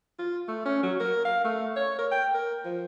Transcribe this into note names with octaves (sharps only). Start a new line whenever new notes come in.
F4
A3
C#4
F#3
A#4
F5
A3
C#5
A#4
G5
A#4
F3